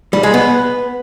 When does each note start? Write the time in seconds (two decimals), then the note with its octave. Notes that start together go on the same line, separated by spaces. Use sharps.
0.13 G3
0.23 G#3
0.34 B3